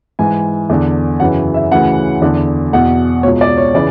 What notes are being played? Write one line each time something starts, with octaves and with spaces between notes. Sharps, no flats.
G#2 E3 G#5
E2 D3
F#2 C#3 E3 F#5
E5
D2 C#3 E3 F#5
E2 D3
E2 B2 F#5
C#2 B2 C#5
D5
C#5
C#3 E3 D5